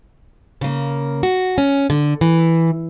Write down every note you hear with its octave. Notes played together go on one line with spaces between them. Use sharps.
C#3 A#3
F#4
C#4
D3
E3